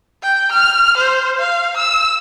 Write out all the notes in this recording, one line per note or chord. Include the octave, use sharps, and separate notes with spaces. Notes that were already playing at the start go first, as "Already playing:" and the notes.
G5
F6
C5
F5
E6